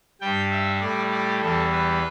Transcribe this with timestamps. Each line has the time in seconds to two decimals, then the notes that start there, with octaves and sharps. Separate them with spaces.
0.21 G2 G3 G5
0.51 E5
0.81 A2 G3 D5
1.12 D5
1.42 E2 E3 G3 A4
1.72 B4